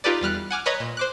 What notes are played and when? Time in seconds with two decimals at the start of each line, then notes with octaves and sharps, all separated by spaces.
0.04 D#4 F4 G4 A4 B4 D5
0.21 E2 G3 F6 F#6
0.51 F#5 G#5 D6 F6
0.66 B4 C#5 D#5 A#5 B5
0.80 A#2
0.97 C5 D6 F#6